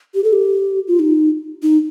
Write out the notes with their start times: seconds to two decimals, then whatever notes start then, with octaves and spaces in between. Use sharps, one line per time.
0.15 G4
0.24 A4
0.33 G4
0.88 F4
0.99 D#4
1.63 D#4